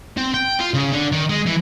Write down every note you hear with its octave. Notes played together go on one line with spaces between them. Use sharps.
C4
G5
F4
C#3
D3
D#3
G#3
E3